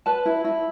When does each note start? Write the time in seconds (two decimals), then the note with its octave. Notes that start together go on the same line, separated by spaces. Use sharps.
0.06 B4 A5
0.26 E4
0.44 E4